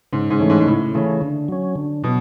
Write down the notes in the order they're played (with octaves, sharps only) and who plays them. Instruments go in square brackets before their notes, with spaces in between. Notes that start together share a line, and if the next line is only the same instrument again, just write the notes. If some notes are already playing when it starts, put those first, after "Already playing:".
[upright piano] G#2 [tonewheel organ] C#3
[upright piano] G#2
[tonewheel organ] E3 A3 C#4
[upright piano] G#2
G#2
[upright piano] A2 [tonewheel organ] C#3
[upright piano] C#3 [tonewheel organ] E3 A3 C#4
[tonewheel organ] D3
F#3 C#4
D3
[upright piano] B2 [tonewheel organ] F#3